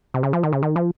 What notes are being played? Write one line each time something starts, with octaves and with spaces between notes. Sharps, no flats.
C3
C#3
F3
D#3
C#3
D#3
F3